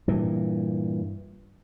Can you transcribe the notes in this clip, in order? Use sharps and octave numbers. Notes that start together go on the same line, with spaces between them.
G2 A#2 E3